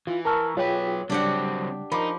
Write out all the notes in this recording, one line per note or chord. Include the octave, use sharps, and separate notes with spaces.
E3 F4
A#4 A5 A#5 C#6 E6 F6
F#3 F4 G#4 B4 C#5 G5
C#3 F#3 G3 C4 D4 G4 F#5
F3 D#4 A#4 A#5 B5 D6